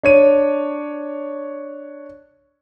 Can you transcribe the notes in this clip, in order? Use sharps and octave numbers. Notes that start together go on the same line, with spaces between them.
D4 C#5 D#7